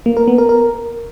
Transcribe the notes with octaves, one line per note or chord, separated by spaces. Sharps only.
A#3
A#4
B3
A#4
A#4